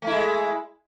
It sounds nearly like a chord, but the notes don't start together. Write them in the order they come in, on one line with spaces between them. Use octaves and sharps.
A3 E4 G#3